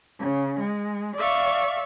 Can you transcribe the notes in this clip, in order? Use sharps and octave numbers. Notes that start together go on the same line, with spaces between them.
C#3
G#3
D5 E5 F5 C#6